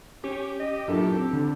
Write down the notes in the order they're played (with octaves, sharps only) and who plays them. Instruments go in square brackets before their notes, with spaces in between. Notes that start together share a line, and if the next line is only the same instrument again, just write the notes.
[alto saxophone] C#4 [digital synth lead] G4
[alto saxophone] D#5
[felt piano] F#2 A#2 [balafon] D4 E4 [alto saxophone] A4
[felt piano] C4
[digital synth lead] D3 [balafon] D4